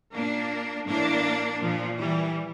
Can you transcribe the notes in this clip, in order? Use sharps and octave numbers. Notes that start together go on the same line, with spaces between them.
A#2 A#3 D4
A2 E3 A#3 D4
A#2 F3
E3 G3